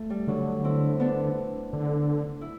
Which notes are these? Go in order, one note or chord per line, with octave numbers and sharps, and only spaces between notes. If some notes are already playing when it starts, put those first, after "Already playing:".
Already playing: A3
G3
D3 F#3
C4 E4
B3 D4
D3
E4